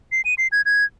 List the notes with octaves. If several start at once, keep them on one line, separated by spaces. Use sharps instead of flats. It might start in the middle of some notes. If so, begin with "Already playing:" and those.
C7
D#7
C7
G#6
G#6